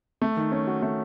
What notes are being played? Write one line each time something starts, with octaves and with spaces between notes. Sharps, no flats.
A3
D#3
C#4
F#4
A3